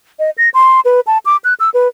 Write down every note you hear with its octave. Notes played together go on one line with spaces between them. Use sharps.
D#5
A#6
C6
B4
A5
D6
F#6
E6
B4